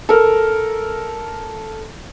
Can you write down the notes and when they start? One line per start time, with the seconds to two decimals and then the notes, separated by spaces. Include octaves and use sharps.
0.09 A4 A#4